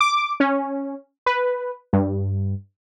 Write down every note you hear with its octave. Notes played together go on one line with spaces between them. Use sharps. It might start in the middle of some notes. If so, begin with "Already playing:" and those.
D6
C#4
B4
G2